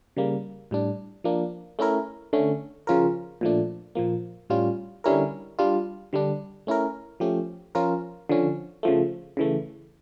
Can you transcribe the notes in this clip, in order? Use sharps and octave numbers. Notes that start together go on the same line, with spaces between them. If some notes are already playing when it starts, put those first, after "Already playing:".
C#3 G3 A#3
A2 G3 D4
F3 A#3 D4
A3 C#4 E4 A#4
D3 A3 C#4
C#3 F3 C#4 F4 A#4
A#2 F3 A3 D4
A#2 F3 A#3
A2 G3 C#4 F4
D3 G3 C#4 E4 A#4
G3 D4 F4
D3 G3 D4
A3 C#4 E4 A#4
F3 A3 C#4 G4
F3 C#4 F4 A#4
D3 F3 C#4
C#3 F3 A3
C#3 E3 A3